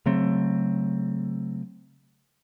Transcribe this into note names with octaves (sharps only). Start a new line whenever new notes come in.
C#3 F#3 A3 C4